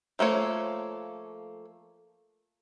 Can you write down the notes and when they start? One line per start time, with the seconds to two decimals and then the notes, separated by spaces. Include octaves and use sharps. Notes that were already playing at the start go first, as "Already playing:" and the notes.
0.19 F3 A3 A#3 C#5